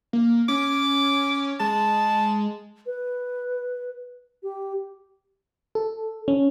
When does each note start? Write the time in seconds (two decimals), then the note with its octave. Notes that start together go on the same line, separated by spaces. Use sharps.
0.13 A#3
0.48 C#4 D6
1.60 G#3 A5
2.86 B4
4.43 G4
5.75 A4
6.28 C#4